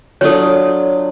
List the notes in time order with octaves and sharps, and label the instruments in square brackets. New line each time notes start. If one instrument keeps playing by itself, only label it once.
[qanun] F#3 D4 F4 [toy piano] A4 C#5